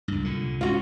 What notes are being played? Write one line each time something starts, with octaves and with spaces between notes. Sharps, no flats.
C#2 G2
C2 A#2 D3
G#2 C#4 F4 F#4